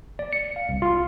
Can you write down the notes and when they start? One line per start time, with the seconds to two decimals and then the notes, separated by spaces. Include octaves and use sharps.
0.19 D5
0.33 C#7
0.56 F5
0.69 C2
0.82 F4